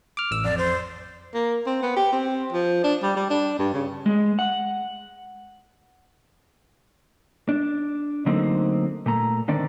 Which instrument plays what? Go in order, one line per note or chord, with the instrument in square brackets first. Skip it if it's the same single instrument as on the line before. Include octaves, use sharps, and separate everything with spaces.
[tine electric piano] D6 F6
A1 E6
[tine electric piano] F2 [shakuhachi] D5
[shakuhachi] C5
[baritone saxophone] A#3
C4
B3
G4
C4
F3
D4
G3
G3
D4
G2
C#3
[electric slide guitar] G#3
F#5
[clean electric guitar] D4
D3 F#3 A3 A#3 C4 D#4
A#2 A3 A#5
D3 D#3 C4 D5